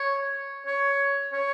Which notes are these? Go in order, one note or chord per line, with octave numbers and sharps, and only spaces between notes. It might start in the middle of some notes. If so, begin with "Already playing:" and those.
Already playing: C#5
C#5
C#5